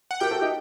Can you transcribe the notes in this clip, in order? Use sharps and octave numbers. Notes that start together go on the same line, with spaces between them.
F#5
G4 A#4 G5
F#4 A4
D#4 G4